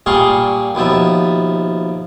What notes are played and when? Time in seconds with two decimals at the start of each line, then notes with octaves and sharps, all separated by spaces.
0.06 A#2 G3 G#4 F5 C6 C#6
0.75 D#2 B2 F3 E5